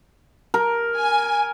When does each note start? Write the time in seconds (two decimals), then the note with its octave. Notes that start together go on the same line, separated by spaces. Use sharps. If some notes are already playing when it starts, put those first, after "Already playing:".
0.54 A#4
0.97 G#5